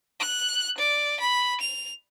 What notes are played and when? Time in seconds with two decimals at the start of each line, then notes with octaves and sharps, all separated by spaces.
0.20 F#6
0.78 D5
1.20 B5
1.61 F7